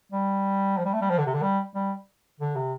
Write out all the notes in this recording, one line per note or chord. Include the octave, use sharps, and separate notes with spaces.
G3
F3
G3
A3
G3
F3
D3
C3
D3
G3
G3
D3
C3